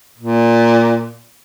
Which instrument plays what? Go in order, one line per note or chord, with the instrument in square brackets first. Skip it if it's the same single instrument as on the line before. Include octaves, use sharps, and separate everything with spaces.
[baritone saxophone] A#2